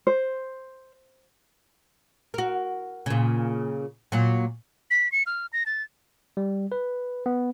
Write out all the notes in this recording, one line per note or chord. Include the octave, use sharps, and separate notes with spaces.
C5
F#4 A#4
A#2 C#3
A#2 F#3
B6
C#7
F6
A#6
A6
G3
B4
B3